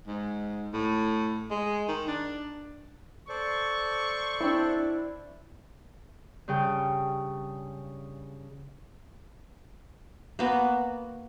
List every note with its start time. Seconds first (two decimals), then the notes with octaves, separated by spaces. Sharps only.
0.07 G#2
0.73 A2
1.51 G#3
1.88 D#3
2.07 D4
3.29 A4 C5 D5 C#6
4.40 C4 D4 E4
6.48 G2 C#3 G5
10.39 A#3 B3 F#4